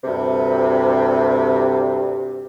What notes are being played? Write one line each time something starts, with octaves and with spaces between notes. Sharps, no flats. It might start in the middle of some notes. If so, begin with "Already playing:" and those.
D2 G2 C3